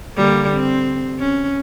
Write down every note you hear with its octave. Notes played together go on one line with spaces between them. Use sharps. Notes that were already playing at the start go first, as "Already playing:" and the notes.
D3 G3 A#3
C4
C#4